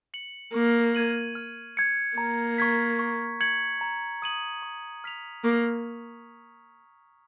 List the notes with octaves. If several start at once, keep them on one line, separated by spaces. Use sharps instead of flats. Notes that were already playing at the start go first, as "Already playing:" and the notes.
C#7 F#7
A#3 C#6
G#6 D#7 F#7
F6
G#6 C#7
A#3 A#5
C#6 G#6 B6
C#6
G#6 C#7 F#7
A#5
D#6 G#6 D#7 F#7
C#6
F6 B6 F7
A#3 C#6